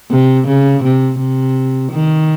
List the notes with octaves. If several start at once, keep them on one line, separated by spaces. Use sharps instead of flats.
C3
C#3
C3
C3
D#3